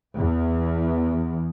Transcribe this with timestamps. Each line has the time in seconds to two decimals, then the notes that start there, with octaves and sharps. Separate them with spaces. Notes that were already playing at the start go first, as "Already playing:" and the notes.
0.16 E2